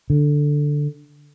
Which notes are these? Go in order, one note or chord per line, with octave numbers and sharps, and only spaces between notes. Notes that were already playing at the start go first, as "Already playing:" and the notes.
D3